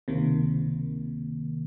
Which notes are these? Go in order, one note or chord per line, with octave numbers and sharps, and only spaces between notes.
C#2 C3 D#3 A#3